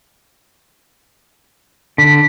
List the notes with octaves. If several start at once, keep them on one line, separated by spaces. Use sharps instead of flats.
D3 B6